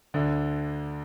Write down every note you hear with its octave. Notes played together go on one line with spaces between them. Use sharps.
D2 D3